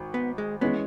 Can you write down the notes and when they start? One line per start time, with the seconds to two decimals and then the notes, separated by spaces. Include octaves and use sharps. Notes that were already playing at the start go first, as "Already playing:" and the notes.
Already playing: G#1
0.14 B3
0.38 G#3
0.61 E3 G#3 B3 C#4